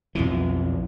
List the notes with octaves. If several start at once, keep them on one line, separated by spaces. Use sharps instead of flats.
B1 F2 E3